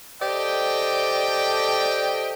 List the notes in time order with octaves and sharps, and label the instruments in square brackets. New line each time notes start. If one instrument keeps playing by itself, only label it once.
[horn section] G4 A4 C5 D5 D#5 G5